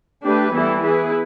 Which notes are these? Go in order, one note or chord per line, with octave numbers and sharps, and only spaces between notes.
A3 D4 G4 B4
E3 G3 B3 E4 A4
B3 E4 G#4 B4